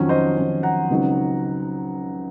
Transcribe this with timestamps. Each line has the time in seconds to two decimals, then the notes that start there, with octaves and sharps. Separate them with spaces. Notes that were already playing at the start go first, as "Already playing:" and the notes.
Already playing: F2 D#3 F#3 C#4
0.09 C5 D#5
0.37 F2 D#3 F#3 C#4
0.63 F#5 A#5
0.90 C#2 C#3 F#3 C4 D#4